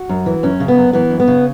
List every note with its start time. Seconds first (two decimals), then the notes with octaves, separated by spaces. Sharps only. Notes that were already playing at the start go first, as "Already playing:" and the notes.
Already playing: F#4
0.09 F#2
0.26 E3
0.43 F#2 C#4
0.60 C#3
0.68 B3
0.77 F#2
0.93 E3 B3
1.10 F#2
1.20 B3
1.28 C#3